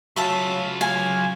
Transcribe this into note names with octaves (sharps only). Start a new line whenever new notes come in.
C#3 F#3 F4 E5 F5 A5
F5 G#5